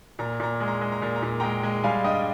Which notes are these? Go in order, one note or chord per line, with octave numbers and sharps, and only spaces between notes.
A#2 A#5
A#2 A#5
G#3
A#5
G#3
A#5
A#2
A#5
A#2
G#3 G5 A#5
G#3
G3 F5 G#5
G2 D#5 G5